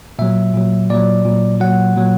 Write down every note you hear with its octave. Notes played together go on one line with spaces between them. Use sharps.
A#2 F#3 E5
A#2 F#3
A#2 F#3 D5
A#2 F#3
A#2 F#3 F#5
A#2 F#3